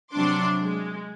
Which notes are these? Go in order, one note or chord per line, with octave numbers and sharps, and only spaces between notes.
C3 F#3 D4 C6 D6
G#3